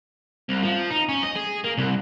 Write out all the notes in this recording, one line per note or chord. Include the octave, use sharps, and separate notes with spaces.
C2
F3
D#4
C#4
D#5
G#4
A#3
C2